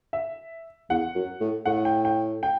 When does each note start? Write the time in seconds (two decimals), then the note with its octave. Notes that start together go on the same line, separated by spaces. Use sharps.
0.13 E5
0.89 E2 F#5
1.15 F#2
1.40 A2
1.65 A2 F#5
1.85 G5
2.05 G5
2.43 G5